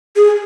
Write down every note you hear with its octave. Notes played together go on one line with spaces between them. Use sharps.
G#4